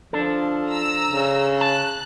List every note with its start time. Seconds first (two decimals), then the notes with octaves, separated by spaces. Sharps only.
0.13 F3 D4 A4
0.69 A#5 E6
1.09 C#3
1.61 A5 F#6